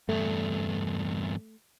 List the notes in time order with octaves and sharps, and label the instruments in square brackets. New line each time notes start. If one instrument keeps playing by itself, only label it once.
[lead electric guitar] E2 G2 [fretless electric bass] A3